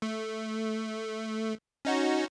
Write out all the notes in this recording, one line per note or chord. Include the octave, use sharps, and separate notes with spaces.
A3
C#4 D#4 F#4